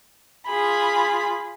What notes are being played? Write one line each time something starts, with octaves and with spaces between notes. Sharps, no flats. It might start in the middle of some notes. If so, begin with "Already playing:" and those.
F4 G#4 B5